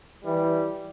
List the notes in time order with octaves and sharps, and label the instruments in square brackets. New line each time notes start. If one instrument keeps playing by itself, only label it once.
[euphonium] E3 [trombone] G3